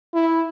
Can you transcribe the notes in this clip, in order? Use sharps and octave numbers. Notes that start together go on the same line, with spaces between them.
E4